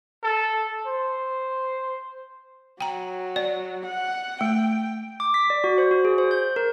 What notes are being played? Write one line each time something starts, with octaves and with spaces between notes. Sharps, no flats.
A4
C5
F#3 G5 A#5
D5
F#5
A3 G5
D6
B6
D5
F#4
C5
F#4
G#4
C5
G6
A#4